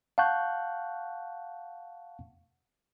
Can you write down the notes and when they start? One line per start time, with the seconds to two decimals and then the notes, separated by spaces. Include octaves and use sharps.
0.18 F5 F#5 A5 C#6 F#6 G6